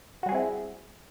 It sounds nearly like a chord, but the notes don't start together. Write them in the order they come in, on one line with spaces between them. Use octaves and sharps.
F#4 G3 G#4 C4 E4